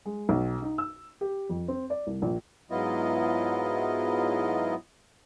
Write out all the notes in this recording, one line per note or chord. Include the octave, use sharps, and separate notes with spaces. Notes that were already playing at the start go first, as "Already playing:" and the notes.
G#3
B1
D#4
E6
G4
F2
C4
D5
C2
A#1
G#2 F#3 B3 E4 F4 D#5